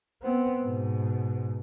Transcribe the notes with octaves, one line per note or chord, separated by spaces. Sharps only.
B3 C4
G#2 B2